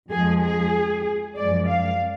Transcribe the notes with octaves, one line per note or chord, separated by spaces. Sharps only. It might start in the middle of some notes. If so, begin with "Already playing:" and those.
F2 F3 G#3 G#4
G#4
F#2 F3 G#3 D5
F5